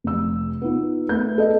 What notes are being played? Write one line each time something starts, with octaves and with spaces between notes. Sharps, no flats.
F1 E6
B3 D#4 F4
A3 B3 B4 G6
A4 D#5